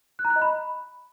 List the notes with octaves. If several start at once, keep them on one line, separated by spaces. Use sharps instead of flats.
F#6
A#5
F#6
D#5
B5